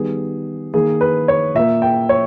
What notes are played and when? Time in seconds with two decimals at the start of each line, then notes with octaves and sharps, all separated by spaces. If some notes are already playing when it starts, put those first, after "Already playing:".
Already playing: D#3 G3 B3 G#4
0.74 D#3 A#3 G#4
1.01 B4
1.28 C#5
1.55 A#2 A#3 E5
1.82 G5
2.09 C#5